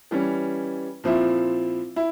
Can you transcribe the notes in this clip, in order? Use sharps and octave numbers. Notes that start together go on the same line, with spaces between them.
E3 G3 C#4
A#2 F3 C4 E4
E4